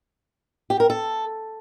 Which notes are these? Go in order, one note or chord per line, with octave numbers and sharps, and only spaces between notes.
G4
A#4
A4